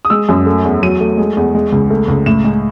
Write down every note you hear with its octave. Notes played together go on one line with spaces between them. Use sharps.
D#6
G#3 E6
F#2
A3
E2
F#3 D#7
A3
G#3
E2
G#3
C#2
A3
C#2
A2 E7
G#3